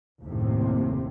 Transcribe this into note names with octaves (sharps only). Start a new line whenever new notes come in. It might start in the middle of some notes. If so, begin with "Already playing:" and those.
F#1 D#2 A2 C3